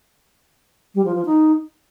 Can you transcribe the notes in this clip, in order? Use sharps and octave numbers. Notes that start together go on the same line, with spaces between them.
G3
F3
F3
D#4